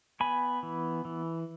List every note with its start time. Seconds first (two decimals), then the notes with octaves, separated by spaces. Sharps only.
0.20 B3 G#5 B5
0.63 E3
1.05 E3